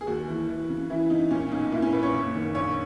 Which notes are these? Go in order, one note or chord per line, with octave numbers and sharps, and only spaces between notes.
G#4
D#2 F#4
E3
E3
C#3
E3 E4
C#3 D#4
A#2 C#4
B1 D#4
A#2 E4
C#4
A#1 B4
C#5
F#1
D#3
A#1 C#5